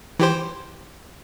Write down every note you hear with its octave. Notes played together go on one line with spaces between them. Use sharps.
E3 G4 C5